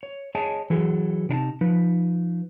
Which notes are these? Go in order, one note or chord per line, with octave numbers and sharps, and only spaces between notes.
C#5
G#4 C#5 D#5 G#5 A5
E3 F#3 G#4 A4
C3 D4 D#4 A5
F3 D#4 B4